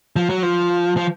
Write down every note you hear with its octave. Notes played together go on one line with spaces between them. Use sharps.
F3
F#3
F3
F3